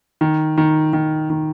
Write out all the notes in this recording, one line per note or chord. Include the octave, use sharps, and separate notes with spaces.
D#3
D#3
D#3
D#3